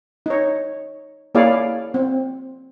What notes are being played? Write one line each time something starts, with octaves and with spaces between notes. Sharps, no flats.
D#4 C#5
A#3 E4 G#4 C#5 D5 F5
C4